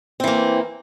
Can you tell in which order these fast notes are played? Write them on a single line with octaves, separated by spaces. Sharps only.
C4 E3 A#3